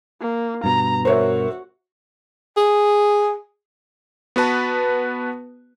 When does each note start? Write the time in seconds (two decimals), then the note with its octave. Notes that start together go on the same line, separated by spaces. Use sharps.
0.21 A#3
0.64 G2 B2 A#5
1.05 F#4 A#4 C5 C#5 E5
2.57 G#4
4.36 B3 F#4 B4 A5